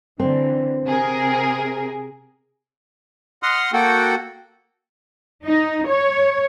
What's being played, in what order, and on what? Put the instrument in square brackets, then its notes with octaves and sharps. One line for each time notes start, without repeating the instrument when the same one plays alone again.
[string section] D3 E3 [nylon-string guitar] C4
[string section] C3 G#4 A#4
[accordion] D#5 F#5 C6 D#6 F6
A#3 F#4 A4 F#5 G5
[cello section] D#4
C#5